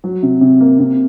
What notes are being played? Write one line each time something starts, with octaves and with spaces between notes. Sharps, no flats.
F#3
C3
C3
A#3
C3